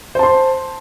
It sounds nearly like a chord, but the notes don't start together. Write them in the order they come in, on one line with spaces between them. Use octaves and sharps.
C5 A5 C6